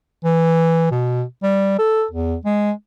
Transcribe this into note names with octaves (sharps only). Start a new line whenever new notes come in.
E3
B2
G3
A4
E2
G#3